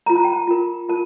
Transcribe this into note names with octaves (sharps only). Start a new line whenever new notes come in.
F4 A#4 A#5
A5
G5
A5
F4 A#4
F4 A#4 A5